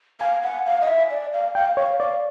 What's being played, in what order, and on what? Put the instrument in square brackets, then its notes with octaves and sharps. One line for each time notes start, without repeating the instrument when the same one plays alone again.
[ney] F5 [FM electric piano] G#5
[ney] F#5
F5
D#5
E5
D5
F5
[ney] F5 [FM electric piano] G5
[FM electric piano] C#5 [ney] F5
[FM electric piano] D5 [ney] F5